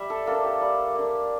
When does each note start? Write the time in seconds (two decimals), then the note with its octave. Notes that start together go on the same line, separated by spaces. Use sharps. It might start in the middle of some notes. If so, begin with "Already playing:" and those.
Already playing: G3 E5
0.10 A4
0.26 A#3 D4 A4
0.44 G4
0.61 G3
0.95 A#3 D4